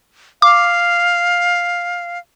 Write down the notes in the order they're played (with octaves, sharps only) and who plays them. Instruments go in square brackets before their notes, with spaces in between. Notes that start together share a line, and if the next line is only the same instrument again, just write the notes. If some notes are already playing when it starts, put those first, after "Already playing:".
[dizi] F5 [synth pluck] D6